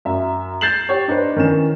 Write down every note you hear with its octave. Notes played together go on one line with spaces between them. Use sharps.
F#2 E5
G6 A6 C7 E7 F#7
G4 C#5
D4 D#4 B4 C5
D#3 E3 C#4 E7